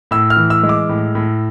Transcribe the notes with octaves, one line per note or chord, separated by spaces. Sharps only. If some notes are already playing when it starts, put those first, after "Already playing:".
A2 E6
F6
E3
E6
G#3
D6
A2
A2